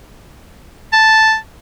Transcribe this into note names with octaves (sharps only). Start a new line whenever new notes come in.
A5